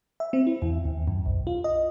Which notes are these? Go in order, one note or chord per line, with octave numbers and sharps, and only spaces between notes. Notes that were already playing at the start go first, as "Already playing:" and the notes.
E5
C4
E4
E2
D#2
F#2
B1
F4
D#5